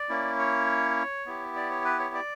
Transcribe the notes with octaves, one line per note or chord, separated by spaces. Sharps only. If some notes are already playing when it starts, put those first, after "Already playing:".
Already playing: D5
A#3 C#4 E4
C#5
B3 E4 G4
D5
C#5
B4
C#5
D5